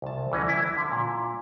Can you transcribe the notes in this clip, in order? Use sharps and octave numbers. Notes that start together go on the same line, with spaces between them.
C2 A5
D2 E3 C#4 D#5
E4
D3
A#2